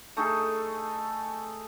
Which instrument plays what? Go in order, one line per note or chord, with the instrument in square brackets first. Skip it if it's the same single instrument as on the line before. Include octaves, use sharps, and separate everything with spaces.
[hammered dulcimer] A3 D#4 G#4 A4